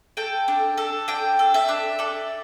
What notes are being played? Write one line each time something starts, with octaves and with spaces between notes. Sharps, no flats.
A4 G5
D4
A4
D4 G5
A4
E5
D4
A4 D5